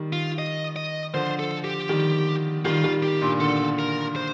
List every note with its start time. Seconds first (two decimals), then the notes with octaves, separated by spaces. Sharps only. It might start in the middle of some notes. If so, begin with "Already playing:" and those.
Already playing: D#3 G3
0.13 F4
0.38 D#5
0.76 D#5
1.14 D3 F3 C5
1.39 A4
1.64 G4
1.89 D#3 G3
2.65 D#3 G3 F4
2.84 D#3 G3
3.03 G4
3.22 G2 A#2
3.40 A#2 D3 A4
3.79 A#4
4.16 C5